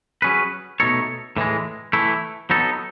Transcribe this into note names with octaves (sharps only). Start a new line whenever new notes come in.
F#3 C#4 G#4 B4
B2 A3 D#4 A4 C#5
A2 E3 G#3
E3 A3 E4
F#3 B3 D#4 A4